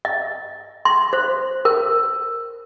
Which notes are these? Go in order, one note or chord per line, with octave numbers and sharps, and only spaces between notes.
D#5
C6
C5
A#4